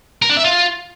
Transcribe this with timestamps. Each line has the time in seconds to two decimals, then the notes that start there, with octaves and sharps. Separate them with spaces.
0.22 A#4
0.30 D4
0.37 E5
0.44 F4